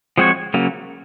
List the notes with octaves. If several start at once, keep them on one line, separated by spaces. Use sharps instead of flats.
F3 G#3 C4 F#4 C#5
C#3 F#3 A#3